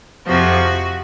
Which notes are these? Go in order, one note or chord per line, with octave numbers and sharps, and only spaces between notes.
F2 C3 F3 F#4